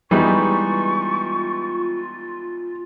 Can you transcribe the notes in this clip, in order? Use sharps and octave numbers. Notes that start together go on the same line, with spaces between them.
E3 G3 G#3 B3 D#4 F4 C#6